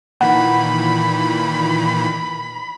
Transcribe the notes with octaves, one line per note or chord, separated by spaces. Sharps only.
A#2 D#3 E3 F#5 B5